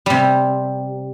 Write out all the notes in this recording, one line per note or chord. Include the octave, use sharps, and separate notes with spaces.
C3 G3